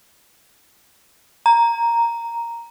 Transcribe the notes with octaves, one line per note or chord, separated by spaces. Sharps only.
A#5